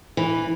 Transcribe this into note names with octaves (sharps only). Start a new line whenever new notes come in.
E3